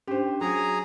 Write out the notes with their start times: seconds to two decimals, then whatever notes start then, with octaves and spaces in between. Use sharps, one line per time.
0.07 C#4 D4 G4 C5
0.41 F#3 G#4 A#5